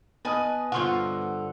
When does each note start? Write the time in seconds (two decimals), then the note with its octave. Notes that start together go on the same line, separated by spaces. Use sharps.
0.25 B3 B4 D#5 G#5 A5 D#6
0.72 G2 D3 F4 C5 F#5 C6 C#6